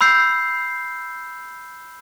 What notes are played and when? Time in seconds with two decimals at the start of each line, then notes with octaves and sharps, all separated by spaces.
0.01 B5 E6 G6 C7